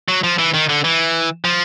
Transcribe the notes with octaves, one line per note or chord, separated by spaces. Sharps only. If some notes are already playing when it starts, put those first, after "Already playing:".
F#3
F3
E3
D#3
D3
E3
F3